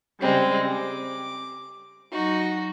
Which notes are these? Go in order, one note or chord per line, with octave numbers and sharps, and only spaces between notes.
C#3 G3 G#3 C4
D6
F#3 D#4 F#4